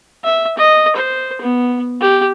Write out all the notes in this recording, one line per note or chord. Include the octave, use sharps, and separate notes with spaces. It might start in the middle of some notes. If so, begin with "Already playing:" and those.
E5
D#5
C5
B3
G4